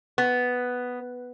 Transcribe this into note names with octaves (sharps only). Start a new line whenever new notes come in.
B3